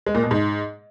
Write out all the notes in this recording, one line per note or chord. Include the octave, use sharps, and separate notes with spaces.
G#3
A#2
B2
G#2